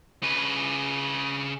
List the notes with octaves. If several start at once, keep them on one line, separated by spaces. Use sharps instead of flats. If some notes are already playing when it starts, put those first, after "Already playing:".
C#3 B4